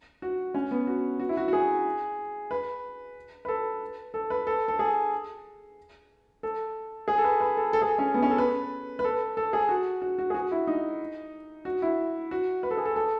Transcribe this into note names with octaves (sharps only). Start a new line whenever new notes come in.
F#4
C#4
B3
F#4
F#4
E4
F#4
F#4
G#4
B4
B4
A4
A4
B4
A4
A4
G#4
A4
G#4
A4
B4
B4
A4
A4
G#4
C#4
B3
C#4
A4
B4
B4
A4
A4
G#4
F#4
F#4
F#4
G#4
F#4
E4
D#4
F#4
E4
F#4
B4
A4
G#4
A4
A4